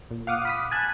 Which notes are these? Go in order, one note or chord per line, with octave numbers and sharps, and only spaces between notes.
A#2
F5 F#5 D6 D#6 F6
B5 D#6 B6
G#5 A5 F#6 G#6